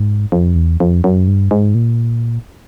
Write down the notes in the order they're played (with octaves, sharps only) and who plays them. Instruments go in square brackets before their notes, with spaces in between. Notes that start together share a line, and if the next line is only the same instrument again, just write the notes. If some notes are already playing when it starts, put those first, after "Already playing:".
Already playing: [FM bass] G#2
F2
E2
F2
F#2
G2
G#2
A#2